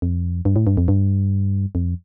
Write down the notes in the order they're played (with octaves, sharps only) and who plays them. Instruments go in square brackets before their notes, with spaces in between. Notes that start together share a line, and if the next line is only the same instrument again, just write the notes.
[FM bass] F2
G2
A2
G2
F2
G2
F2